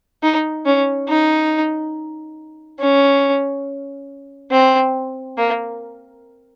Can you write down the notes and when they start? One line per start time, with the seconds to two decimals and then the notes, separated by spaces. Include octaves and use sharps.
0.23 D#4
0.66 C#4
1.09 D#4
2.80 C#4
4.51 C4
5.38 A#3